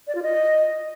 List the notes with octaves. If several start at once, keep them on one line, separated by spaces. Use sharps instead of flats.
D5
F4
D#5